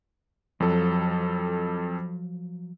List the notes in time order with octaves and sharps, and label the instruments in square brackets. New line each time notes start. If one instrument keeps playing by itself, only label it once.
[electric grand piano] F2 A4 [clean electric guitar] F3 F#3